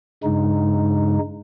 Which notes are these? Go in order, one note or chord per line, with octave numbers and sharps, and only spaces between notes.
G2 C#3 G#3 D#4